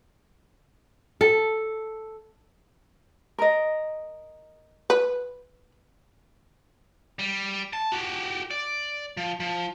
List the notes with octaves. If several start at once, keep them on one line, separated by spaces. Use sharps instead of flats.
A4
A#4 D#5
B4
G3
A5
F#4 G4
D5
F3
F3